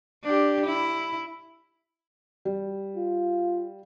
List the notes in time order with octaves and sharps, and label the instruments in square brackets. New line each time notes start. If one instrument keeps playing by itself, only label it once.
[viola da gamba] D4 G4
E4
[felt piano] G3
[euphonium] F4